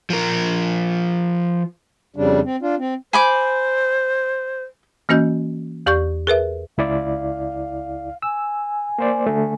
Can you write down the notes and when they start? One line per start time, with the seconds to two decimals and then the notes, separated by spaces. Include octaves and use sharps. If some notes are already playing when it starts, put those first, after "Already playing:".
0.10 F3 A#4
2.16 F2 C#3 G3 D4
2.45 C4
2.62 D4 F4
2.78 C4
3.13 C5 G#5 B5 D6
5.09 E3 A#3 C#4 F#4 D#5 G6
5.86 E2 G4 D5 C#6 G6
6.27 G#4 A#4 B4 E5
6.78 C#2 E4 D5 F5
8.22 G#5 E6
8.99 A#3 C5 D5
9.27 D3 A3